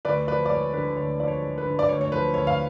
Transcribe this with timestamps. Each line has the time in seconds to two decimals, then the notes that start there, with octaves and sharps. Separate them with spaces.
0.05 D2 B4 D5
0.28 F3 B4 D5
0.46 D5
0.50 G#3 C#5
0.74 D3 B4
0.97 D2 C#5
1.20 F3 D5
1.28 C#5
1.42 G#3
1.58 B4
1.65 D3
1.79 D5
1.89 D2 C#5
2.01 C#5
2.12 F3 B4
2.34 D2 C#5
2.47 F5